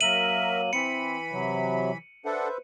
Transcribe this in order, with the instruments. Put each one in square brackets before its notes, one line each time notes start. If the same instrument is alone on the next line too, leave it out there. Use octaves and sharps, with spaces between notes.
[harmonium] F#3 A#3 [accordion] A#4 E5 [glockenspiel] D#7 F#7
[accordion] E3 B5 [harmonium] C4 [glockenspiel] C#7
[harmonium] C3 F#3
[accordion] D4 A4 F#5 [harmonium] B4 C5 E5